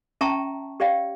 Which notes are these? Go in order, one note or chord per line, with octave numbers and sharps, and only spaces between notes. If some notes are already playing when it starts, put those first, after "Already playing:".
C#4 E5 G5 A5 A#5 C#6
G4 C#5 D5 F5 G5